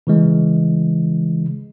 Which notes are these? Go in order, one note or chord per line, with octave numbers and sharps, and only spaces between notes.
C#3 E3 G#3